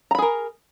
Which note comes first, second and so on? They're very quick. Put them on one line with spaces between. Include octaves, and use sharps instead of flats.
A#5 B5 G#4 A#4